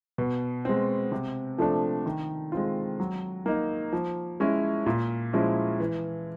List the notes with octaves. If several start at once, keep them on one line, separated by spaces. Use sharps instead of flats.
B2
G#3 C4
C3
F3 A3 D4
D#3
G#3 C4 F4
F#3
A#3 D#4
F3
G#3 C#4 E4
A#2
F3 G#3 C#4 E4
E3